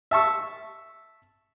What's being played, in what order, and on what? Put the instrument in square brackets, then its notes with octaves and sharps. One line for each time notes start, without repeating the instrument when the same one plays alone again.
[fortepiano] E5 A5 C#6 E6